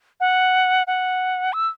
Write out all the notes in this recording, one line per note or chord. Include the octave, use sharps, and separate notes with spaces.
F#5
F#5
E6